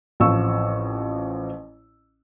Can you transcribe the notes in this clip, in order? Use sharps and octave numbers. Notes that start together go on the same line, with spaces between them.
A1 F3 C4 C#6 E6